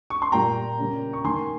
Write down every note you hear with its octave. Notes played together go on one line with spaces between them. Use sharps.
C#6
C6
A#2 G3 A#3 G5 A#5
C#3 G3 A#3
C#6
D#3 A#3 G#5 C6